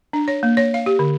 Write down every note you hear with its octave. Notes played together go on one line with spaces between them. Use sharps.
D4
C#5
A#3
C#5
F5
G4
D3